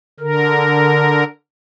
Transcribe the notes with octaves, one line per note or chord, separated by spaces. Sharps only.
D3 A#4